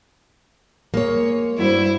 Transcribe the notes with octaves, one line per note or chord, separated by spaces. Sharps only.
G#3 A#3 C#5
G2 E4 F#4 C5 D5